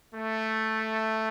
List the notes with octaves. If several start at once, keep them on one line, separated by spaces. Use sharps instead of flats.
A3